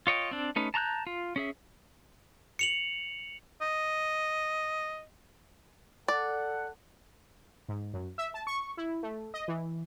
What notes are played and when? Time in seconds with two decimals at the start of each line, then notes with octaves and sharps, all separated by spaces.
0.07 F4 C#5 D#5 G5
0.31 C4 D4
0.56 A3 C#4 D#4 B4
0.74 A5 A#5 C6 F#6 G6
1.07 F4
1.36 C#4 G#4 E5
2.59 C#7 F7 F#7
3.62 D#5
6.08 A4 D5 F#5
7.68 G#2
7.93 F#2
8.18 E5
8.34 A5
8.47 C#6
8.77 E4
9.03 A3
9.34 D#5
9.48 E3